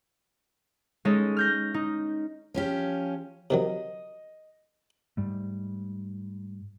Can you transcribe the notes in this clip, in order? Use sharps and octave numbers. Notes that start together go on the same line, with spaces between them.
G#3 C#4 D#4 A4
F6 G6 A#6
D#4
F3 C#4 G4
C3 D#3 F#3 D#5
G#2 G3 A3